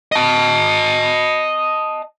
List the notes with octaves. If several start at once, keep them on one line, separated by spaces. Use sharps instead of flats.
D#5 A5